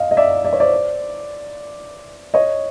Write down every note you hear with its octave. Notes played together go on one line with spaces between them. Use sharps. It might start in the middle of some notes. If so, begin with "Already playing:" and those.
Already playing: D#5 F5
D#5
D5 E5
D5
C#5
C5 D5
C#5 D#5